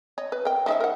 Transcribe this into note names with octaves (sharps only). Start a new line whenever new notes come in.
C#5 D#5
B4
A#4 G5
F3 D#4 E5
A#4 F#5